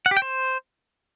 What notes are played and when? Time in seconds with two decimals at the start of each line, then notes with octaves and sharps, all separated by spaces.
0.06 F#5
0.11 G4
0.17 G5
0.22 C5